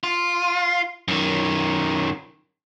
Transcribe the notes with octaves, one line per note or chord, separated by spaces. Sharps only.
F4
F#2 D#3